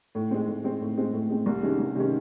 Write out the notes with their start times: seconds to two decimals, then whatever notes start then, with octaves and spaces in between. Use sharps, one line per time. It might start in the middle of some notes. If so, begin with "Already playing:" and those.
0.15 A2
0.31 G#3 C4
0.48 A2
0.64 G#3 C4
0.81 A2
0.98 G#3 C4
1.13 A2
1.30 G#3 C4
1.46 C2
1.63 C3 D#3 G#3 C#4
1.79 C2
1.96 C3 D#3 G#3 C#4